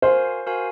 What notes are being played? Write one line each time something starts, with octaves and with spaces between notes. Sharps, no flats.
F#4 A#4 C5 F5 G#5
F#4 A#4 F5 G#5